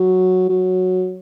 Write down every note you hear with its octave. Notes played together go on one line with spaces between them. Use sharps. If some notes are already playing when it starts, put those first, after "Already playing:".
Already playing: F#3
F#3